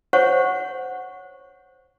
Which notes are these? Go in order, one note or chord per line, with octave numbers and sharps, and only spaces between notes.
C5 C#5 F#5 C#6